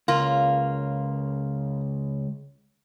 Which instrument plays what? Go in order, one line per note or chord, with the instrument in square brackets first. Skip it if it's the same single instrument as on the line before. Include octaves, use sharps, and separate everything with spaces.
[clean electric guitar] C#2 [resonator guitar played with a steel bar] A#3 F4